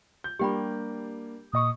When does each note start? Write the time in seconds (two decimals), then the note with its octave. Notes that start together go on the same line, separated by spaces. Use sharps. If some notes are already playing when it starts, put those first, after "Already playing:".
0.24 G6
0.39 G3 A#3 D4 G4 G5 B5
1.53 A#2 D#5 C#6 D#6